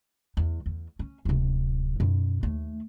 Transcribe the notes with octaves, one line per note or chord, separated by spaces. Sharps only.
E2
E2
C#4
D1 C3
F#2 B2
D#2 A3